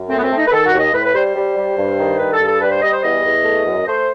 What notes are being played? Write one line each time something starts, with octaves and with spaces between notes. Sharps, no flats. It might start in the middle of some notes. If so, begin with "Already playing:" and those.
Already playing: F#2
A3 C4
B3
C4
A3
D#4
B4
D#3 A4
F#4
D#2
D#5
A2 B4
B4
G3 C5
C5
G3
G3
G2
D#3
G2 B4
A4
G2
A4
G3 B4
C5
G3 D#5
C5
E2 D#5
E2
A3
F#2
A3 C5